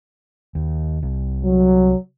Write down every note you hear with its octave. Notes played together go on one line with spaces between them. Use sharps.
D#2
C2
F#3